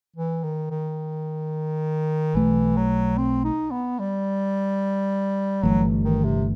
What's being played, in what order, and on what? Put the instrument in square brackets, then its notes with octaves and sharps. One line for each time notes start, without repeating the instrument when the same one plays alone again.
[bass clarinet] E3
D#3
D#3
[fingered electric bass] B1 B2 A3 [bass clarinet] E3
[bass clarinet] F#3
C4
D#4
B3
G3
[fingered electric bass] G1 G2 E3 A3 [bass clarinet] F#3
[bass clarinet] D#3
C3